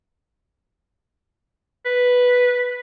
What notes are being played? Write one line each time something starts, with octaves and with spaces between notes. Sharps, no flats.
B4